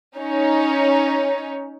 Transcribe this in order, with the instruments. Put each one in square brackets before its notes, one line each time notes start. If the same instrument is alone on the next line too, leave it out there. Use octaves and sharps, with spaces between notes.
[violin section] C#4 D#4 C#5